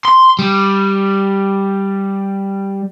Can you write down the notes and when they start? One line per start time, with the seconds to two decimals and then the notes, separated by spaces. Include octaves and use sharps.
0.05 C6
0.39 G3